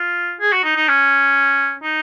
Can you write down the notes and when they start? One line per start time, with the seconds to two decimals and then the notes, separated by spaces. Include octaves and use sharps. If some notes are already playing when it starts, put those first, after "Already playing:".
Already playing: F4
0.40 G#4
0.52 F#4
0.64 D#4
0.76 D#4
0.88 C#4
1.83 D#4